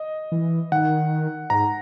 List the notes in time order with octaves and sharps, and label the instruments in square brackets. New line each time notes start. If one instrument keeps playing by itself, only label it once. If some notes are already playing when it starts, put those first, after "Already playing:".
Already playing: [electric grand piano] D#5
[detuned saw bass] E3
[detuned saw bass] D#3 [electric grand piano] F#5
[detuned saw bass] G#2 [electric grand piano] A#5